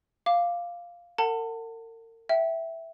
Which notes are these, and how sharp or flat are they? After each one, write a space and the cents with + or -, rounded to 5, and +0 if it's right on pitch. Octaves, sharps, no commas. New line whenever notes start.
F5 +0 D6 +0
A#4 -40 F#5 +0 A5 +30
E5 +0 G5 -25